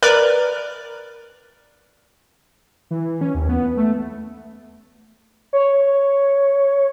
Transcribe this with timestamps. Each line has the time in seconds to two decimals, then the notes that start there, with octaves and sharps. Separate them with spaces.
0.03 A#4 B4 D5
2.91 E3
3.21 C#4
3.35 D#2
3.49 B3
3.77 A3
5.53 C#5